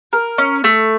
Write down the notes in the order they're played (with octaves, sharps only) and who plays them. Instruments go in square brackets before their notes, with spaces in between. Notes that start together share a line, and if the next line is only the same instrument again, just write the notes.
[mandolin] A#4
C#4
A3